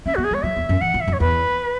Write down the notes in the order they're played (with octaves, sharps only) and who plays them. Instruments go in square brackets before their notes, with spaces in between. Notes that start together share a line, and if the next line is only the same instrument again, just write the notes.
[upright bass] C#4 [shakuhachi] E5
[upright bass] B3 [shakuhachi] F#4
[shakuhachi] G#4
[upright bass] G#3
[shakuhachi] C#5
[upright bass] F#3 [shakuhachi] E5
[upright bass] E2
F#2
[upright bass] E3 [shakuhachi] F#5
[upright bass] E3
[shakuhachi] E5
[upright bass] F#2
[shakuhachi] C#5
[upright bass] E2 [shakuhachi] B4